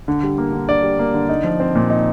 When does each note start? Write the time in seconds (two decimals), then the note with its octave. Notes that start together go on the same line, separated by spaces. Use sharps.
0.08 D3
0.23 G3
0.38 A#3
0.53 D3
0.68 D3 D5
0.83 G3
0.99 A#3
1.14 D3
1.29 D#4
1.44 F3
1.60 C4
1.75 A#2
1.90 D#4